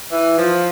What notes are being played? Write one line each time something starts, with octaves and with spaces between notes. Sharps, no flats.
E3
F3